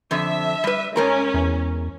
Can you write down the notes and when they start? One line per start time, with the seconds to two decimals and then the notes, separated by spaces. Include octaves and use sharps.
0.11 F2 D3 E5
0.64 G3 B4
0.96 G#2 C#4 A#4 A#5
1.34 E2